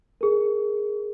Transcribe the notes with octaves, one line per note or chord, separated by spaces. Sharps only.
G#4 A#4